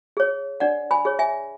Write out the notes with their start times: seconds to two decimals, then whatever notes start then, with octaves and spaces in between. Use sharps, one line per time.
0.17 G#4 C#5
0.60 D4 D5 F#5
0.91 G#5 B5
1.05 G#4 C#5
1.19 E5 G#5